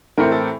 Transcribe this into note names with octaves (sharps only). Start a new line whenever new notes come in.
A2 E3 A3 C4 A#4
A4